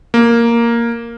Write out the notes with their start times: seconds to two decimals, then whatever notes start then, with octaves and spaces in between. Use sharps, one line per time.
0.14 A#3